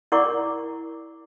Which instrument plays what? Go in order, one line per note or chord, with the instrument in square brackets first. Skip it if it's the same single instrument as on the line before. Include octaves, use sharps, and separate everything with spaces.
[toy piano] E4 A#4 D5 F#5 C#6 D6